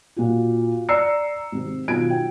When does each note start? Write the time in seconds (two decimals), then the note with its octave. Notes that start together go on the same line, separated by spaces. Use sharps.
0.16 A#2 F#4
0.89 D5 A#5 E6 C7 C#7
1.52 G#1 C3
1.88 B1 D#3 F4 G#6 D7
2.10 G5